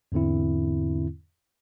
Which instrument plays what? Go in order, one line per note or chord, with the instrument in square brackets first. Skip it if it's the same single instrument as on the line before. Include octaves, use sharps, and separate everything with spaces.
[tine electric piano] E2 G#2 D3 C4 E4